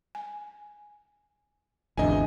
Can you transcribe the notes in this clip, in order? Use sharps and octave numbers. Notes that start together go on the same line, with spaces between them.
G#5
G#1 E2 D3 D4 F4 D#5 G#5